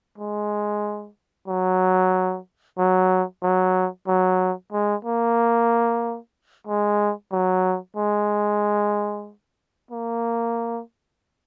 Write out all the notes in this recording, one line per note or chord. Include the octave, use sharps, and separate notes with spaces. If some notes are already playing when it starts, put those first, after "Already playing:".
G#3
F#3
F#3
F#3
F#3
G#3
A#3
G#3
F#3
G#3
A#3